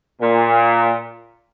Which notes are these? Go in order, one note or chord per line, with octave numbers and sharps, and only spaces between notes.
A#2